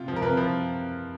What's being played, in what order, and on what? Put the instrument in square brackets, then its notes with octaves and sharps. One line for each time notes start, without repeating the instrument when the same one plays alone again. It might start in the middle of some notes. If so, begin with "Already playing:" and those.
Already playing: [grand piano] C3 F4
F3
A#4
C3 B4
F3